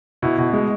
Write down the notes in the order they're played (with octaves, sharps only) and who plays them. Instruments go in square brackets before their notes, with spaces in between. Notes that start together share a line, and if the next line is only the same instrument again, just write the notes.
[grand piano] B2 E4
B2
G#3